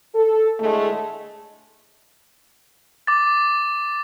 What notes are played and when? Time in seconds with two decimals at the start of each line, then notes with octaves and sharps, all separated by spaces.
0.14 A4
0.60 A2 D3 G#3 A3
3.07 D6 A6